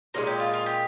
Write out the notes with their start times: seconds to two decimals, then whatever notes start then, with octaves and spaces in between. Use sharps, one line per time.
0.14 A#2 F3 G#3 D#4
0.27 G4
0.40 F4
0.53 F4
0.66 G4